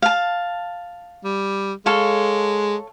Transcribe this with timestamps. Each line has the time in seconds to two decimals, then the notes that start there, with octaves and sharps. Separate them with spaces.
0.02 F5 A5
1.24 G3
1.86 G#3 A4 C#5 F5